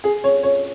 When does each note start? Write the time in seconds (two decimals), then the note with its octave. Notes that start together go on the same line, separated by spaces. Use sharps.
0.04 G#4
0.24 C#5
0.43 C#5